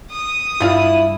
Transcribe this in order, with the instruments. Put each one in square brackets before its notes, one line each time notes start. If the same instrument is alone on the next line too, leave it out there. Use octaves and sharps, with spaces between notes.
[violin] D#6
[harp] G2 [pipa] C3 F4 F5 [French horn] E4